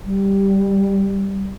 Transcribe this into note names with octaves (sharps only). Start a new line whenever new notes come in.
G3